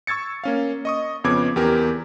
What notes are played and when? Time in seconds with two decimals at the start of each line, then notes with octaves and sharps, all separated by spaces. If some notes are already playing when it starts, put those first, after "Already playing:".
0.07 C#6 E6 G#6 A6 C#7
0.44 A#3 C#4 F5
0.85 D#5 C#6 D#6
1.24 F2 C#3 B3 C#4 D6 G#6
1.56 E2 G4 A#4